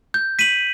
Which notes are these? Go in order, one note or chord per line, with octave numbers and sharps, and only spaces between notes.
G6
B6 D#7 F#7